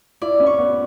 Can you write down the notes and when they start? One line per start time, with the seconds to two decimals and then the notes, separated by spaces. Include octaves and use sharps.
0.22 E4 D5
0.40 C#4
0.47 C#6
0.58 B3